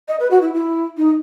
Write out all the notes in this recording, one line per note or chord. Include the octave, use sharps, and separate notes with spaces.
D#5
B4
F#4
E4
E4
D#4